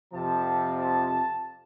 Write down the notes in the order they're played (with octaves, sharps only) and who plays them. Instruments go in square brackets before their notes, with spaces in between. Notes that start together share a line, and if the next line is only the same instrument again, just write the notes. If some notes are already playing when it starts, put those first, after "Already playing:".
[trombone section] F2 C3 F3 [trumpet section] A5
[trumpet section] A5